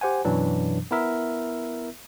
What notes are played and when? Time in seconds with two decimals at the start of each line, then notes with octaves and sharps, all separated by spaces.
0.01 G4 C5 F#5 G#5
0.25 F#2 B2 E3 F#3 D4
0.91 B3 E4 A#4 E5